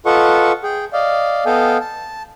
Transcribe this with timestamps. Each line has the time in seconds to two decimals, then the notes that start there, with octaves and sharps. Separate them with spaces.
0.06 F4 A4 B4 D#5 F#5 C#6
0.63 G#4 G5
0.93 D5 D#5 F5
1.46 B3 A4 D#5 F5 G5 G#5
1.80 A5